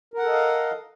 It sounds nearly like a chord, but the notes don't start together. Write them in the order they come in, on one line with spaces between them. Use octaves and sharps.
A#4 F#5 A4 D#5 F5